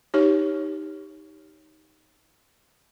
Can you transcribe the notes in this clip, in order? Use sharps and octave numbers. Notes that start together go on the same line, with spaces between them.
D#4 G4 C#5